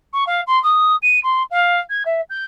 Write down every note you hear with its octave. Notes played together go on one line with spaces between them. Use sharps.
C#6
F5
C6
D#6
D#7
C6
F5
G#6
E5
G6